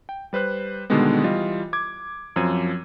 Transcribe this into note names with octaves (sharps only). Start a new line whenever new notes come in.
G5
G3 B4 C5 F#6
B2 D3 D#3 G3 G#3 B3
E3 G3 F4 D#5
D6 G#6
F#2 F3 C4 G#6 D#7